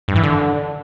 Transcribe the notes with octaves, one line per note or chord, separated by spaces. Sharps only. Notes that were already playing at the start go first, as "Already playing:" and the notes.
G2
E3
D3